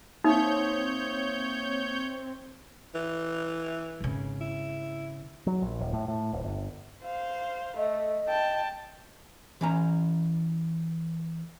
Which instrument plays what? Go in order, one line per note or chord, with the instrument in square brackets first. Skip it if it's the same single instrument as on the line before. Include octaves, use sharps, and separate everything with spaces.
[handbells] A#3 E5 D#6 [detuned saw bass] C4 [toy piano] D#4 [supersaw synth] C#5 G6
[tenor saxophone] E3
[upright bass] G#1 C#3
[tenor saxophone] E4
[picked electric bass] F#3
A#1
D#1
A2
A2
D1
G1
[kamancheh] C5 F5
[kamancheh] A3 [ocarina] D#5
[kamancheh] G5 A5
[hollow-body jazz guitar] E3 C#4 A#5